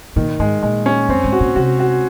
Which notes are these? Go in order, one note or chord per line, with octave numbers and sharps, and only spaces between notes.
A#2 D#3
G#2 G#3
A#2 G#3
C#4
F#2 C4
G#2
F#4
A#2
C3 F#4
F#4